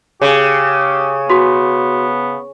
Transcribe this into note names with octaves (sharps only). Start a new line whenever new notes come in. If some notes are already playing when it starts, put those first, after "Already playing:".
C#3 G4
B3 F#4 C6